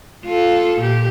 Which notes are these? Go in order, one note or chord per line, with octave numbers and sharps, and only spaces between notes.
F4 A4
A#2 G4